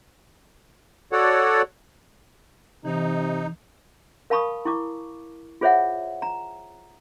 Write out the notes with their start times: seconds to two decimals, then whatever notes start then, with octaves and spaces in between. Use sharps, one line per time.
1.12 F#4 A4 C#5 D5 F#5
2.85 C3 E3 D#4
4.30 A#4 F5 A5 B5 C#6 D#6
4.65 E4 C#6 D6
5.61 F4 G#4 C5 C#5 E5 F#5
6.22 A#5